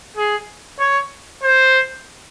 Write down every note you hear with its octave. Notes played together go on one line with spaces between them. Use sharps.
G#4
C#5
C5